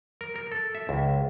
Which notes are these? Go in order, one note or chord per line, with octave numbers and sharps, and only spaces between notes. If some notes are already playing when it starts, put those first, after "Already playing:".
A#4
A#4
A4
E5
C#2